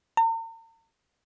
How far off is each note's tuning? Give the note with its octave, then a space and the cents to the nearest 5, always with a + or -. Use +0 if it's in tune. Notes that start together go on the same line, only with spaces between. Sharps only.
A#5 -45